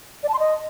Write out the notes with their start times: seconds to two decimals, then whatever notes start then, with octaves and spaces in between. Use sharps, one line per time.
0.23 D5
0.29 A5
0.34 C6
0.39 D#5